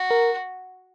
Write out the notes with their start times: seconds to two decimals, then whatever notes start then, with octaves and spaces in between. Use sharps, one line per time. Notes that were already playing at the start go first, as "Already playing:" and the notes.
Already playing: F#4
0.11 A#4